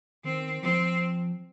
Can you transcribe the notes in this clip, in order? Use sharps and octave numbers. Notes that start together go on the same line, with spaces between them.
D#3 C4
F3 C4